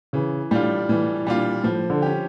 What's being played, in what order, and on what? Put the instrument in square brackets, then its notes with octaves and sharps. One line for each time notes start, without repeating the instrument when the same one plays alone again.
[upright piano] C#3 [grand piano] E3
[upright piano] A2 [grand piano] G3 D4 F4
[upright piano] A2 [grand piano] E3
[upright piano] A#2 [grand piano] G3 D4 F4
[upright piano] A2 [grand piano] F3
[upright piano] D3
[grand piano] C#4 G4